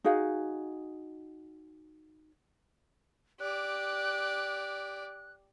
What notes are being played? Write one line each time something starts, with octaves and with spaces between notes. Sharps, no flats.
D#4 F#4 G#4 F5
G4 D5 F#6